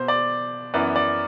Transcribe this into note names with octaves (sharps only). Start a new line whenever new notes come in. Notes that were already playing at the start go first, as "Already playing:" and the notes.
Already playing: B2 C5
D5
F#2 E3 B3 D5
D5